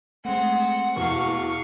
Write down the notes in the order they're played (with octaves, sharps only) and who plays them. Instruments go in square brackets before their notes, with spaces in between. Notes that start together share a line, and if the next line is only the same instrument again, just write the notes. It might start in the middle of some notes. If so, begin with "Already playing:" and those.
[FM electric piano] G#3 A3 [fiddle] C4 [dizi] F#5
[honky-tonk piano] E2 B2 [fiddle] F5 C#6